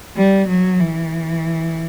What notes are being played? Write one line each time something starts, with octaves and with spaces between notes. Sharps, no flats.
G3
F#3
E3